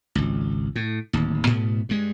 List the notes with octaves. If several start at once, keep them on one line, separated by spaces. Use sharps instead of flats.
G#1 C#2
A2
D1 D#2
G#2 B2 B3
G2 G#3